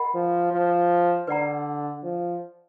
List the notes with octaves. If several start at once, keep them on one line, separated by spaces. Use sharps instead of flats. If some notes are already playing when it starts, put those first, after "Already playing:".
Already playing: A#4 D#5 F#5 B5
F3
F3
D3 B4 D5 F#5 A#5
F3